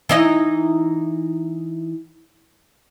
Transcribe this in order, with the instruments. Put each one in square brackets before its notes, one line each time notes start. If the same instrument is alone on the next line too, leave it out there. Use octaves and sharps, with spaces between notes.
[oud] E3 D#4 D#5